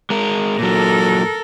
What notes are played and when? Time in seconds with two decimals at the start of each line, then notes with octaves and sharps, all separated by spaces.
0.10 G#3 A#4
0.59 A#2 F#3 A4 A#4